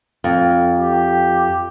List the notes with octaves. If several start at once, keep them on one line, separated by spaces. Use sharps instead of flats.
F2
G4